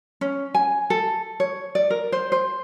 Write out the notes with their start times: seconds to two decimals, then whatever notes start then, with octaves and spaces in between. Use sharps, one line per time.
0.21 C#4
0.55 G#5
0.90 A4
1.40 C#5
1.75 D5
1.90 A#4
2.12 C5
2.32 C5